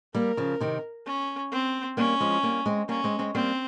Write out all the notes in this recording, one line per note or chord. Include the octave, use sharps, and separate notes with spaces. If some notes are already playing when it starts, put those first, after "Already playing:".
G3 A#3 A#4
C#3 F3
C3 D#3
C#4
C4
G3 A#3 C#4
F3 G#3
G3 A#3
G#3 C4
G3 A#3 C#4
G#3 C4
G#3 C4
G3 A#3 C4